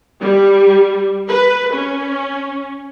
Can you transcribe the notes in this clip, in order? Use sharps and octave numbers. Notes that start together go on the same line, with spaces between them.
G3
B4
C#4